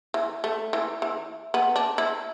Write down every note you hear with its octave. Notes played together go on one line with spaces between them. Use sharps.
E3
A3
E3
E3
B3
D4
E4